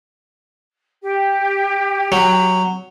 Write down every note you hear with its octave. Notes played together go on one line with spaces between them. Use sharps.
G4
F#3